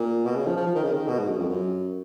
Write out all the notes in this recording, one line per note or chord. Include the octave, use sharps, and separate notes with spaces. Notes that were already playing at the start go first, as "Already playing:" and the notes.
Already playing: A#2
B2
C#3
F3
F3
F3
D#3
C#3
D#3
B2
G#2
F#2
F2
F#2